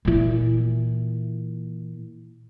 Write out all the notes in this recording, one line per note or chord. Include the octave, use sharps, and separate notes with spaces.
A#2 E3